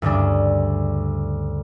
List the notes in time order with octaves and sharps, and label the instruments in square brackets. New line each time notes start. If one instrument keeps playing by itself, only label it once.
[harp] D2 G2 C#3 D4